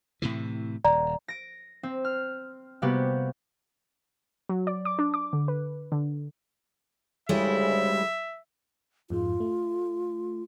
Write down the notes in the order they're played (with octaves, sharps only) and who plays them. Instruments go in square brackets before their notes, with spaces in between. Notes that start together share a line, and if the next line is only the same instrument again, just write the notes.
[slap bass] A2 C3 E3
[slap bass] D#1 [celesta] D5 A#5
[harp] A#6 D7
C4
F6
C3 G3 A#3 B3 F#4 G4
[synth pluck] F#3
D5
D6
D4
D6
D3
B4
D3
[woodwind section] D2 C#3 [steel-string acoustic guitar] G3 G#3 E4 [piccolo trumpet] E5
[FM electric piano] F2 G#2 G#3 [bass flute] F4
[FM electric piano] A3